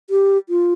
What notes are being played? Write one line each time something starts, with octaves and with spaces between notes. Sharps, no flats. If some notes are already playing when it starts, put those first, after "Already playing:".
G4
F4